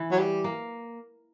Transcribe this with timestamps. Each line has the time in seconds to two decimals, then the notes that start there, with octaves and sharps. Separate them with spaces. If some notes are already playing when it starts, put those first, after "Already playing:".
Already playing: E3
0.12 F#3
0.19 G3
0.44 A#3